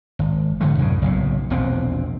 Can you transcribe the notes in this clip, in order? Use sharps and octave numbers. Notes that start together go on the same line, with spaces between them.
G#1
G#2 D3 F3 A3
C2 F#2 A2 C#3
F#1 B1 A2
E1 A#1 B2 C4